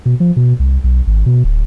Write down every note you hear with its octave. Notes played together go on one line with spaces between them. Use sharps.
B2
F3
B2
C2
B1
G#1
B2
D1